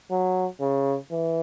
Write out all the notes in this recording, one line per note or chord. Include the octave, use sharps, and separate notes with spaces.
F#3
C#3
E3